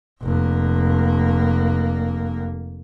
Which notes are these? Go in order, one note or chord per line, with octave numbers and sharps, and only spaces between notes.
F1 A#3